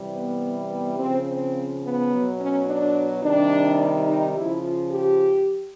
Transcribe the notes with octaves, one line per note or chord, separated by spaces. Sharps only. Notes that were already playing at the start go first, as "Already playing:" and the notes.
Already playing: C3 E3 G3
B3
B3
C#3 F3 C4
C4
B3
B2 F#3
C#4
D4
C3 D#3 G3 D4
D#4
C#3 F3 E4
F4
G4